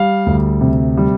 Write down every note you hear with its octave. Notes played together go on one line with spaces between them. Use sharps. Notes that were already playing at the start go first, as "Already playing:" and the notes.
Already playing: G3 F5
D2
C3
G3